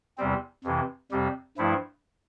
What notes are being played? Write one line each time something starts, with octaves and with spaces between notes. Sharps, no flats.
E2 C3 G3 C4
F2 C3 E3
F2 C3 G3 C4 G4
G2 F3 A3 E4